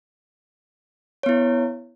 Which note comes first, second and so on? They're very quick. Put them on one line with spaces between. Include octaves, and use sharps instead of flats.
C#5 B3 E4